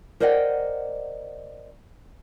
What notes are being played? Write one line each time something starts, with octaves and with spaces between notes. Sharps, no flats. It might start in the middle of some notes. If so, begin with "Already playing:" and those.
A#4 C5 D5 D#5 F#5 G5